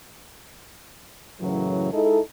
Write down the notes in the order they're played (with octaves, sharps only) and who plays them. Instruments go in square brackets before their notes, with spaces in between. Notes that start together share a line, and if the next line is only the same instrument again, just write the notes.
[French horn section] F#2 A2 C#3 E3 F#3
G#3 D#4 E4 A4